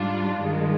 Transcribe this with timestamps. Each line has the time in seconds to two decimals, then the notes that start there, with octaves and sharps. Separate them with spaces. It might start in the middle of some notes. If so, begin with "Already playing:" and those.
Already playing: G#2 G3 D4 F4
0.40 G2 D#3 G#3